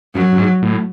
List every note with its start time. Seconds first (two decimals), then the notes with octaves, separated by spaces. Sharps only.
0.14 F#2 F#3
0.32 F#2
0.37 G#2
0.62 A2